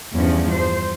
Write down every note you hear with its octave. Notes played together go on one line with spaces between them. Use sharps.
E2 G2 F3 C#4
C5